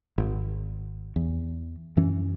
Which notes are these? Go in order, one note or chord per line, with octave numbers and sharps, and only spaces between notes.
G#1
E2
F#2 E3 C#4